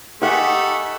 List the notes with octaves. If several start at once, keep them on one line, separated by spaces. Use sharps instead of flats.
A3 D#4 G4 F#5 G#5